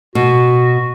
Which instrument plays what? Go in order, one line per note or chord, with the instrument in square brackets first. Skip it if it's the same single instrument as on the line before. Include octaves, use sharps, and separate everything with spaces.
[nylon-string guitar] B2 [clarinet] F#4